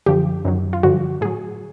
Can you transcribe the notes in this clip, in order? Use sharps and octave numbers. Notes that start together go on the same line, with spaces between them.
F#2 D3 F3 G4
F#2 D#3 F#3
F4
G2 D3 F3 F#4
A2 F#3 G#4